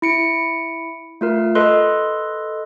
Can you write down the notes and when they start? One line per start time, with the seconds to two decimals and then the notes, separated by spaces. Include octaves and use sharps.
0.02 E4 C#7 D7
1.21 A3 F4 A#4
1.55 A4 B4 D#5 C6 F#6